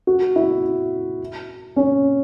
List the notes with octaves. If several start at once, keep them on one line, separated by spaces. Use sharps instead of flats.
F#4
E4
C#4